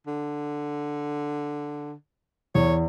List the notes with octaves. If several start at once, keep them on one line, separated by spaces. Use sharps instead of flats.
D3
E2 C#5